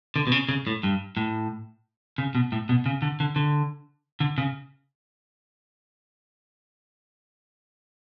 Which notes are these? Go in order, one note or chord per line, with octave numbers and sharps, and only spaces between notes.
D3
B2
C#3
C#3
A2
G2
A2
C#3
B2
A2
B2
C#3
D3
D3
D3
D3
C#3